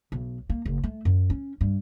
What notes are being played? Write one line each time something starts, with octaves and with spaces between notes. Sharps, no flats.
B1
A#3
F#1
A3
F#2
C#4
G2